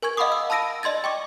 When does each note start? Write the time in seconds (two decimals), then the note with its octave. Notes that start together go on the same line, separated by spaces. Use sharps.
0.02 A#4 G#5 C#6 G#6
0.17 D#5 F5 F#5 B5 D6 D#6
0.32 E6
0.50 A5 B5 E6 A#6 D7 D#7
0.83 D5 D#5 C6 G#6 A6
1.04 G5 C#6 D6